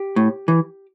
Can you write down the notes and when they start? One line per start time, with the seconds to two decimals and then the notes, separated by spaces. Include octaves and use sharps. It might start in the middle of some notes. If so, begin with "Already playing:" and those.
Already playing: G4
0.16 A2
0.48 E3